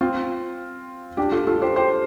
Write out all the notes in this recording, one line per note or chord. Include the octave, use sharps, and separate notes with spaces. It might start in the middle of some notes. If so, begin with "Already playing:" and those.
C4 F4
D4 G4
F4 A4
F4 A4
G4 C5
G4 C5